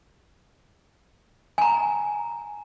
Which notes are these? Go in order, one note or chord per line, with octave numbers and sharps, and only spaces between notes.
G#5 A#5